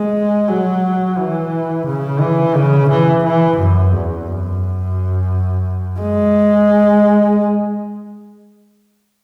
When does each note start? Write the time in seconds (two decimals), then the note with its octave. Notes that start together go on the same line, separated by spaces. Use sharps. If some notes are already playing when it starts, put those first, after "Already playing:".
Already playing: G#3
0.49 F#3
1.18 E3
1.86 C#3
2.21 E3
2.55 C#3
2.90 E3
3.24 E3
3.58 F#2
3.93 E2
4.27 F#2
5.99 G#3